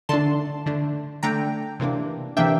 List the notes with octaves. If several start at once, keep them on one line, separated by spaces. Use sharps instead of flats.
D3 A3 D4 A5 C6
D3 A3 D4
D3 A3 D4 G5 A#5
C3 E3 A#3 D4
C3 E3 A#3 D4 E5 G5